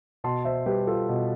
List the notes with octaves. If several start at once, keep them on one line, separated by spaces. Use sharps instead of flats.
B2 A5 C6
C5 E5
G3 G4 B4
F4 A4
B2